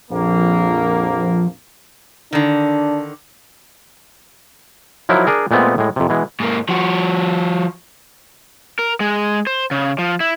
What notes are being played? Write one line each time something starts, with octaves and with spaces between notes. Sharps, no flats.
A#1 F2 F3 A#3
D3 D#3 D4
F3 F#3 D#4 E4 A#4
D4 G#4 A#4
A#2 G#3 A3 B3 C4
A2 G#3
F2 C3
B2 E3 G#3
G#2 A#3
F3 F#4
A#4
G#3
C5
C#3
F3
E4